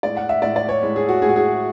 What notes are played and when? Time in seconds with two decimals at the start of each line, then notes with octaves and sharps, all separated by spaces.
0.03 A2 G#3 D5
0.17 F#5
0.29 E5
0.42 A2 G#3 D5
0.56 D5
0.69 C#5
0.82 A2 G#3
0.96 G#4
1.08 F#4
1.22 A2 G#4
1.25 G#3 F#4
1.36 G#4